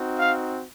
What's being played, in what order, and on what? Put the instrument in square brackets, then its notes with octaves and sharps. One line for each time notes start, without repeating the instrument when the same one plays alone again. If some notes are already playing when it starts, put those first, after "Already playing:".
Already playing: [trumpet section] C4 D#4 F#4
F5